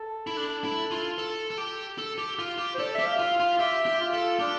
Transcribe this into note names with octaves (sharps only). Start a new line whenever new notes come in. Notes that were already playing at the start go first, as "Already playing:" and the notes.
Already playing: A4
E4
D4 A4
E4
F4
A4
A4
G4
A4
G4
F4
G4
C5
A4 D5
G4 E5
F5
F4
F5
F4
G4 E5
G4
F4
A4
D4 G4